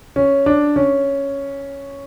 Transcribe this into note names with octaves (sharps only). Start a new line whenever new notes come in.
C#4
D4
C#4